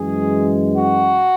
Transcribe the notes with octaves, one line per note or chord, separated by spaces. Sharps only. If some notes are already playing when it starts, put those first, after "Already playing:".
Already playing: F#2 E3 G#3 G#4
F#4